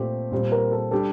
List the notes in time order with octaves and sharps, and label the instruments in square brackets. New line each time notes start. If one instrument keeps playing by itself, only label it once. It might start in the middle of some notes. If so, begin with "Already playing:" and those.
Already playing: [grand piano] A#2 A3 C4 [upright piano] G4
[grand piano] A#2 G3 C4
[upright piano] A#4
A4
[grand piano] G3 D4 G4 [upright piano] A4